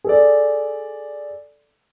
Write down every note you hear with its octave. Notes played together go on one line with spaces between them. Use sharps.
G#4 A4 D5